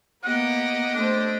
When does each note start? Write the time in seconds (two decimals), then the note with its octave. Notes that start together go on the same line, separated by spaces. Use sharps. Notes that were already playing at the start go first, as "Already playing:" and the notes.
0.24 A#3 B3 G4 D#5 F#5
0.95 A3 D4 C5